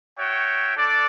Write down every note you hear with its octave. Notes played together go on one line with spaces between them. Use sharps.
F#4 C#5 E5 G5
D4 A4 D5